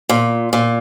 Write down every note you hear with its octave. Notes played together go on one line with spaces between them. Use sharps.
A#2
A#2